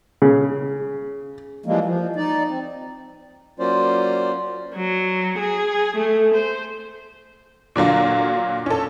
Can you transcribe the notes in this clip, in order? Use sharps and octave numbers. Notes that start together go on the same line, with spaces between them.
C#3
E3 F3 G3 G#3 A#3
F3
D#4 D5
C4
F#3 A#3 C#4 F4 C5 D5
F#3
G#4
A3
C5
A#2 D3 F#3 F4
C#4 A4